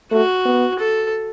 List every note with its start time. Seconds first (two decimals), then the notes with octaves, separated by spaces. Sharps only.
0.12 A3 F#4
0.45 B3
0.79 A4